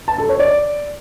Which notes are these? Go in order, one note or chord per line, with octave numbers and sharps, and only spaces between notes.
A5
A4
C#5
D5